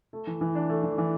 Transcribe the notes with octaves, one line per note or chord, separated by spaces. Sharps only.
A3
E3
E3
D4
A3
E3
E3